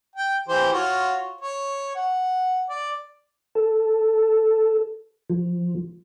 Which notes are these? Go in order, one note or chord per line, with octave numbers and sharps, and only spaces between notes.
G5
E3 G4 C5
F4 F#4 C#5
C#5
F#5
D5
A4
F3